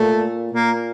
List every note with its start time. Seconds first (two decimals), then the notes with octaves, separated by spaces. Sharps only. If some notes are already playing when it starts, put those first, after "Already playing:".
Already playing: A#2 A3
0.53 A#2 A#3